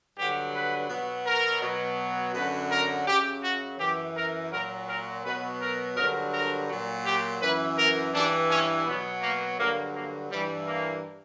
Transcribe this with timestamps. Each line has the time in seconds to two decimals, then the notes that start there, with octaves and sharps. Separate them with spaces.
0.17 G2 D3 F#3 G4
0.54 B4
0.89 B2 F#3
1.26 A#4
1.62 B2 F#3
2.34 F#2 D3 F#3 B4
2.71 A#4
3.07 F#2 C#3 F#3 G4
3.43 F#4
3.79 F#2 E3 G4
4.16 A#4
4.51 A#2 F#3 A#4
4.88 A#4
5.24 B2 F#3 B4
5.60 A#4
5.97 G2 D3 F#3 A#4
6.32 A#4
6.69 A#2 F#3
7.05 G4
7.41 F#2 E3 B4
7.77 A#4
8.13 G2 E3 D4
8.50 C#4
8.86 B2 F#3 B3
9.22 A#3
9.58 G2 D3 F#3 A#3
9.94 A#3
10.30 G2 E3 G3
10.67 A#3